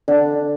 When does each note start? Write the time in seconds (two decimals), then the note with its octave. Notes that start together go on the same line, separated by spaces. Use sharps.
0.08 D3 D4